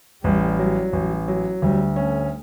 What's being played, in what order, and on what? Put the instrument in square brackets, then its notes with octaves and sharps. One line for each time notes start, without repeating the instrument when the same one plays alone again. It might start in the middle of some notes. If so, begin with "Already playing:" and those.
[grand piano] A1 [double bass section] G3
[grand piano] F#3
A1
F#3
[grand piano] D2 [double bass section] G3
[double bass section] A3 [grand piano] C#4